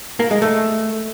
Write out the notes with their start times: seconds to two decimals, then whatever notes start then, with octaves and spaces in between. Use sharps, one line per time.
0.20 A#3
0.31 G#3
0.42 A3